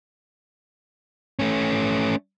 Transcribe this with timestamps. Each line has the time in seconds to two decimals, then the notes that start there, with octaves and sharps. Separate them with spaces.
1.39 A3 C#4